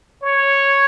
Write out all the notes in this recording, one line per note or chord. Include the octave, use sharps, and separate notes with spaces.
C#5